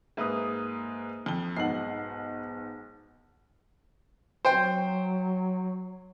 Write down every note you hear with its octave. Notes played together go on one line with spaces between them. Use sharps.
G#2 A#3 B4 E5 D#6
F2 G7
B1 G#2 F#5 C7 F#7
F#3 C5 G5